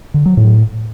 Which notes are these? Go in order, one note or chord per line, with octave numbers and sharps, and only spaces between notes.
D3
F#3
A2